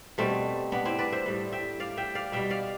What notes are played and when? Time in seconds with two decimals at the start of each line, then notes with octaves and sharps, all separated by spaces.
0.18 B2 G3 A3 C4
0.72 B3 D4
0.85 C4 E4
0.99 B4 D5
1.12 C5 E5
1.26 A2 G3
1.52 E5 G5
1.80 D5 F5
1.97 E5 G5
2.15 D5 F5
2.32 B2 G3 E5 G5
2.50 D5 F5